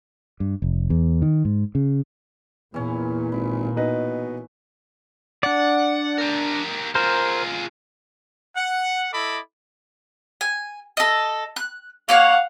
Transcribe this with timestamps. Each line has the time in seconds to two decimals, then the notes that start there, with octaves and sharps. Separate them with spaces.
0.40 G2
0.62 F1
0.90 E2
1.22 D#3
1.45 G#2
1.75 C#3
2.74 E2 A#2 E3 C#4
3.32 G#1 B5
3.77 B2 D#4 B4 D#5
5.43 D4 D5 F#5
6.18 G4 A#4
6.95 F4 G#4 A#4 C5
8.57 F#5
9.13 E4 A4 D#5 B5 D6
10.41 G#5
10.97 A4 D#5
11.56 F#6
12.09 A#3 C#5 F5 F#5 C#6